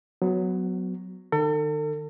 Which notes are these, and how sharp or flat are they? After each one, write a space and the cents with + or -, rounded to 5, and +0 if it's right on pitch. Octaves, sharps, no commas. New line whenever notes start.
F#3 +0 B3 +20
D#3 -40 A4 +40